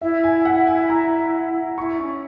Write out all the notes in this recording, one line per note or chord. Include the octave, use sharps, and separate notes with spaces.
E4 E5
G#5
F#5
G#5
A#5
E4 C#6
C#4